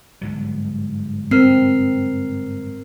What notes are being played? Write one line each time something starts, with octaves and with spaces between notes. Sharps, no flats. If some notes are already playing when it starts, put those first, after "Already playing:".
G1 G#2 F#3
C4 A#4 F6 C7